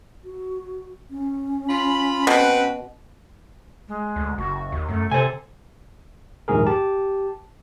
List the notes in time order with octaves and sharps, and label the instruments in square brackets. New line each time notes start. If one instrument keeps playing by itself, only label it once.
[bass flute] F#4
C#4
[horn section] F4 B5
[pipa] B2 [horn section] C4 F#4 B4
[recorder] G#3
[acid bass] D2
[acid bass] F#1 [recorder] F#4
[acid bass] D#2
[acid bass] F#2 [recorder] A3
[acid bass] C3 [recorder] A4 [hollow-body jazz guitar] C5 G#5
[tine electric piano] A#1 D#2 G#2 G#4 A#4
G4 A5